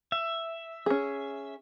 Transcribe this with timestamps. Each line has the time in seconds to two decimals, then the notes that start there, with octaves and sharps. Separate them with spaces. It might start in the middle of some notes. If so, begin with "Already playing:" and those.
0.12 E5
0.86 C#4 G#4